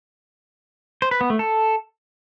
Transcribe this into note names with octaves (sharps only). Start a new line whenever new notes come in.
C5
B4
B3
A3
A4